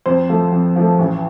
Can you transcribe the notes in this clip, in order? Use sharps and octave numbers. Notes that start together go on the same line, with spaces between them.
F2 C5
F3 A3
F2
F3 A3
A1